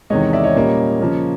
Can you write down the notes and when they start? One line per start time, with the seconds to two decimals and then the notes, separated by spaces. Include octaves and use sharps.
0.10 E2 C3 D#3 G#3 C#5 D#5
0.33 D5 E5
0.44 C#5 D#5
0.56 A#2 G3 A#3 C#4
1.00 C#3 F3 A#3